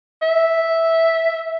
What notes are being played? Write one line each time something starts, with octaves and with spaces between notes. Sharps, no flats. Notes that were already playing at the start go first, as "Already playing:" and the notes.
E5